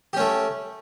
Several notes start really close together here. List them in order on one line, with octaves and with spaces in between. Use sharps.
G4 C#4 A3